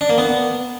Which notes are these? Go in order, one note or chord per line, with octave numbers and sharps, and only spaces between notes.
D4
A#3
B3